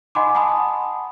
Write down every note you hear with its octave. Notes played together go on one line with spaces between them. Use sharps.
D#5 F#5 G#5 B5 C6 D6
F#5 G#5 A5 B5 C6 D#6